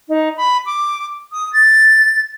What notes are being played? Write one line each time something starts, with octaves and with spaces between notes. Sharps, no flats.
D#4
B5
D6
D#6
A6